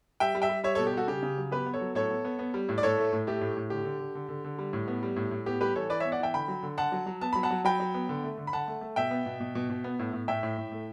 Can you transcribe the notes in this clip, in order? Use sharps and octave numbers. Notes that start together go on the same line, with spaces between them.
G3 E5 G5
G3
E5 G5
G3
G3 C#5 E5
A4 C#5
B2
G4
G3 F#4 A4
C#3 G4
C#3
F#3
B3 G4 B4
B3
A4 C#5
F#3
A2 A4 C#5
B3
B3
B3
G3
A2
D5
A2 A4 C#5
A3
A2
A3 G4
A2
A2
D3 G4
D3
D3
D3
D3
D3
G3
A2
B3
G3
A2
A2
B3 G4
G3 G4 B4
E3 A4 C#5
E3 B4 D5
C#5 E5
B3
D5 F#5
E3 E5 G5
D3 G5 B5
F#3
D3
D3 F#5 A5
F#3
F#3
B3 A5
F#3 B5
F#5 A5
F#3
F#3 G5 B5
F#3
B3
D3
A3
D3
B5
D3 F#5 A5
A3
A3
B2 E5 G5
B3
B2
B2
B2
B2
B3
A2
A2
A2 E5 G5
A2
A2
A3